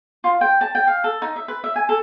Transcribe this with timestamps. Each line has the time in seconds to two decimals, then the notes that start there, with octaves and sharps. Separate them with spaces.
0.24 F4
0.41 G5
0.61 A5
0.75 G5
0.87 F5
1.04 A4
1.22 D#4
1.36 E5
1.48 B4
1.64 E5
1.76 G#5
1.89 A4